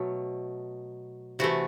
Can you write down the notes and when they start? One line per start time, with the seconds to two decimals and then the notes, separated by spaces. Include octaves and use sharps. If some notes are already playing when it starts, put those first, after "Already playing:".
Already playing: B2 F#3 A3
1.39 C3 E3 A3 F#4